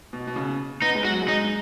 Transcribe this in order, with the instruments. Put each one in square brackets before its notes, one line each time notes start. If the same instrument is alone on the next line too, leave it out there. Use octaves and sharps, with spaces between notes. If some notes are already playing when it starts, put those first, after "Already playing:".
[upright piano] B2
B2
C#3
[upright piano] B3 [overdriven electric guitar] D#4
[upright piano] G#3
[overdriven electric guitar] F#4
[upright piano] F#3
G#3
[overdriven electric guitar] D#4